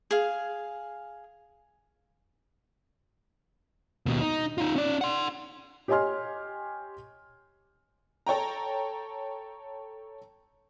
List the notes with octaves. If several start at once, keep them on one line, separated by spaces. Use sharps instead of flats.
G#4 F5
D#2 B2
D#4
D#4 F4
C#4 D5
F#5 C6
G4 C#5 D#5 G#5 C6 F6
A4 C#5 G5 A#5